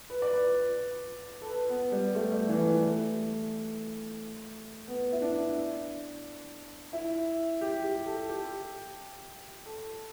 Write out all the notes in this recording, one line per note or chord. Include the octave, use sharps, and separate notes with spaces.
B4
D5
B4
A4
B4
B3
G3
A3
G3
E3
G3
A3
B3
E4
D4
E4
G4
G4
A4
G4
A4